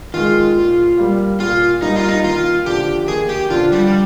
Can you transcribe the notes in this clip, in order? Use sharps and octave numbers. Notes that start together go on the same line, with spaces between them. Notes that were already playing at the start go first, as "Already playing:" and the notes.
D#3 G#3 F4
A#2
G3 A#3
A#2 F4
G3 A#3 D#4
F4
D#4
D#2 F4
D3 F3 G4
D#2 G#4
G4
D3 F3 F4
G3